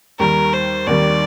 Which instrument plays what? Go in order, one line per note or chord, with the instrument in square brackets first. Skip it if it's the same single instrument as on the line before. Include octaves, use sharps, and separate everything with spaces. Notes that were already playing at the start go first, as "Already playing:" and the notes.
[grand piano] D#2 D#3 G3 [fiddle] A#4
[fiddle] C5
[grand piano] D#2 D#3 G3 [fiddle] D5